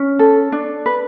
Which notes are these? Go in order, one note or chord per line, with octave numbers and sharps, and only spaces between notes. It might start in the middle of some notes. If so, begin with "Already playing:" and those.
Already playing: C#4
A4
D4
B4